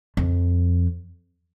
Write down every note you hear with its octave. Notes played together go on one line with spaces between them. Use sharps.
F2